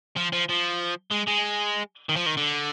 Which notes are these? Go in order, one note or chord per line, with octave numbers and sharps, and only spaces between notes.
F3
F3
F3
G#3
G#3
D#3
F3
D#3
D3